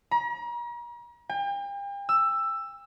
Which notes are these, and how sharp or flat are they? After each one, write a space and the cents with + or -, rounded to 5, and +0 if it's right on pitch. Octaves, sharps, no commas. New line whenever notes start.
A#5 +40
G5 +40
E6 +10